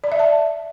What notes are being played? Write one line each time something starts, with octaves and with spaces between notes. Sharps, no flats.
D5
E5
A5